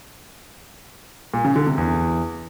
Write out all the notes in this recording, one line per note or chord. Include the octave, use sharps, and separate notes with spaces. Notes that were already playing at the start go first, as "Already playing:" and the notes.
A#2
C#3
D3
C3
E2